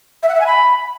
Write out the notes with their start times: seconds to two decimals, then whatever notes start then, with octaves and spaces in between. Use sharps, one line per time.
0.23 E5
0.29 F#5
0.35 E5
0.41 G#5
0.47 B5